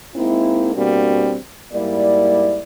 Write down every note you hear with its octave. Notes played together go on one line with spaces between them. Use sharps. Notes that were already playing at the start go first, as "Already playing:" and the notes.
G#3 A#3 C4 D#4 E4
B2 G3 A#3 C4 D4 F#4
G#2 G3 A#3 E4 D5